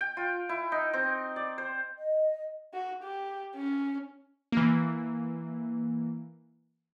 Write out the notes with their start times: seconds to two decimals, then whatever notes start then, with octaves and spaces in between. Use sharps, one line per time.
0.01 G5
0.17 F4
0.49 E4
0.72 D#4
0.93 C4
1.36 D5
1.58 C5
1.98 D#5
2.74 F#4
3.03 G4
3.56 C#4
4.52 E3 A#3